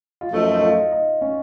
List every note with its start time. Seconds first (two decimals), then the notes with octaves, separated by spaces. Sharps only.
0.21 F4
0.32 F#2 F3 A3 D#4
0.55 D#4
0.63 F4
0.92 D#4
1.21 C#4